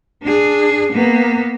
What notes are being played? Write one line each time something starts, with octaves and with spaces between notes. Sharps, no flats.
D4 G#4
A#3 B3